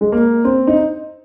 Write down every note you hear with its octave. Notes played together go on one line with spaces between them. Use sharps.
G#3
A#3
C4
D#4